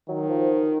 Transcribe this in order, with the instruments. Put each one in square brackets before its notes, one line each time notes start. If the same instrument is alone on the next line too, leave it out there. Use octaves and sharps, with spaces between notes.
[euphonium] D#3 [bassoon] F#3
[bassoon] F3